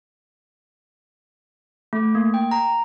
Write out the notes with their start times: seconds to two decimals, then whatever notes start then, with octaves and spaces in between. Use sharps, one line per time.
1.93 A3
2.15 A#3
2.34 G5
2.51 A#5